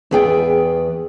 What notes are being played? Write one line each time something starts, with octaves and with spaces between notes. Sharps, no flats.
E2 B3 G#4 D5 G5